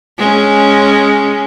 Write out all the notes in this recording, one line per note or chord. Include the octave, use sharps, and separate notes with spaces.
G#3 C#4